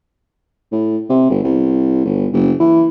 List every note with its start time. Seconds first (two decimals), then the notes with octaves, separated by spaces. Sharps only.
0.72 A2
1.09 C3
1.30 G1
1.44 C2
2.05 G1
2.33 F#1
2.59 E3